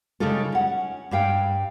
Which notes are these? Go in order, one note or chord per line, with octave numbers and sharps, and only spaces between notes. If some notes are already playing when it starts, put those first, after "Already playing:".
C#3 G3 G#3 D#4 F4 A4
C#4 F#5
G2 G3 F5 G5